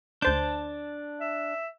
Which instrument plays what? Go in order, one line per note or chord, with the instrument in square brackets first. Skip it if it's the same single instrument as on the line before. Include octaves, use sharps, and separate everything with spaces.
[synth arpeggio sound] D2 C5 G6 [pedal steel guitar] D4 A5
[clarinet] E5